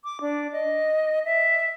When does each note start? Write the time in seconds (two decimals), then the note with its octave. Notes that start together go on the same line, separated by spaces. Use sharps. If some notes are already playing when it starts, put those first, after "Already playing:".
0.04 D6
0.21 D4
0.52 D#5
1.25 E5